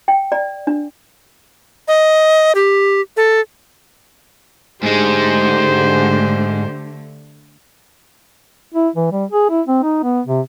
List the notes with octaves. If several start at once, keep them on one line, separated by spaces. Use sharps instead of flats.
G5
D5
D4
D#5
G4
A4
G#2 D3 G#3 A3 G4 C5
E4
E3
G3
G#4
E4
C4
D#4
B3
C3